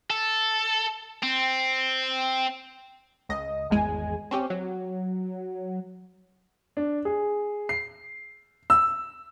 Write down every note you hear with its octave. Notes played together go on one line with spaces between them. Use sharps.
A4
C4
C#2 D#5
G#1 E2 G#3 G#5
C4 C#4 G4
F#3
D4
G#4
C7
E6